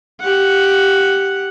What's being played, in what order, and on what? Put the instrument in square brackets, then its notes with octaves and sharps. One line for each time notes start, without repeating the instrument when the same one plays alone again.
[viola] G4 F#5